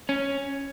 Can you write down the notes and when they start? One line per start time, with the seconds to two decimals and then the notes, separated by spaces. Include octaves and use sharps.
0.09 C#4